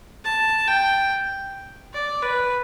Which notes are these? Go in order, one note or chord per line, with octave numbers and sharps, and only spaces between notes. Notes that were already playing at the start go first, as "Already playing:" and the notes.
A5
G5
D5
B4